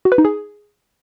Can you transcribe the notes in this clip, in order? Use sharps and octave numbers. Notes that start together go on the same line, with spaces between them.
F#4
B4
D#4
G#4